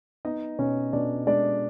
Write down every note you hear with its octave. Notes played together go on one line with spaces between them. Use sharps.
B3 D#4 D#5
B2 C#4 C#5
B2 D4 D5
G#3 D4 D5